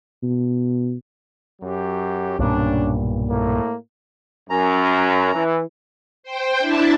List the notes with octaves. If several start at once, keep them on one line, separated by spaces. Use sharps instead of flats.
B2
F#2 F#3 G4
B1 G2 A#2 C#4 D4
A2 A#3
F#2 C#4 A#5
E3
C5 G5
D4 E4 E5 A5